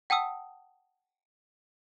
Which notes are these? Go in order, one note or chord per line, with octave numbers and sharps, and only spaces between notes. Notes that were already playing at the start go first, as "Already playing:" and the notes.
F#5 G5 A5 D#6 E6